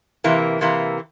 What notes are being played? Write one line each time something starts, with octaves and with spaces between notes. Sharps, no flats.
C3 E3 A#3
C3 E3 A#3